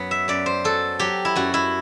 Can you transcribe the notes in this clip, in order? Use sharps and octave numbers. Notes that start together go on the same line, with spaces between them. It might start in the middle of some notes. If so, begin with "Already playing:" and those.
Already playing: F#2 F#3 B3
E5
F#2 D5
C5
F#3 A4
F#3 G4
E4
F#2 F#4
E4